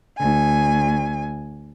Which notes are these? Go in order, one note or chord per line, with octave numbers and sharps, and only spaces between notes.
D2 G#5